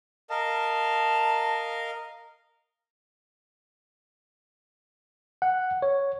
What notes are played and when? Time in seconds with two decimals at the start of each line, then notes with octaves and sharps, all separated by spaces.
0.30 A#4 D#5 F5 A5
5.42 F#5
5.82 C#5